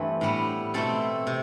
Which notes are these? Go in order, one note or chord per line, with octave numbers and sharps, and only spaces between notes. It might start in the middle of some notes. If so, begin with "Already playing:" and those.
Already playing: G2 E3 A3 C4 B4
A2 G3 B3
B2 A3 C4 A4
C3